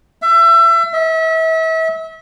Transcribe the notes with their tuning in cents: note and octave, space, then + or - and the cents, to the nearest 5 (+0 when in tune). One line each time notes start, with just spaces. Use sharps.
E5 +30
E5 -35